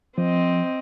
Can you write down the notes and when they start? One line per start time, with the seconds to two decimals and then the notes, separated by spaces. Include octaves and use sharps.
0.18 F3 C4 D#5